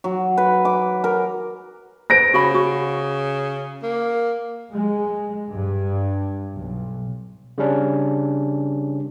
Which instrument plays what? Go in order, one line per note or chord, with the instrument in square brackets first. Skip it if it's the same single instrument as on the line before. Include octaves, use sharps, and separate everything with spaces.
[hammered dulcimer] F#3
B4
D6
A#4
[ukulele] B4 C5 [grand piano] A#6 D7
[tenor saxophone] C#3 [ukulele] F#4 B5
[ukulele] F#4
[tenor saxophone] A#3
[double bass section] G#3
G2
B1
[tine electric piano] C#3 G3 C#4 D4